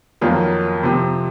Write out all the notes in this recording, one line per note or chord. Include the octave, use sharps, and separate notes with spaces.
F2 D#3 F#3 A#3 F4
C3 F3 C4